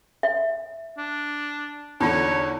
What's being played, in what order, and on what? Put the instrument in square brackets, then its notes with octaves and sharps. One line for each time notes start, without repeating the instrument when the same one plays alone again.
[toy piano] E5
[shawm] D4
[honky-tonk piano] E2 D3 [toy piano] D#4 F4 [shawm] C#5